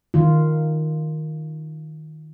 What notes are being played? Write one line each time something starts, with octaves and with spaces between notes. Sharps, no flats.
D#3 F4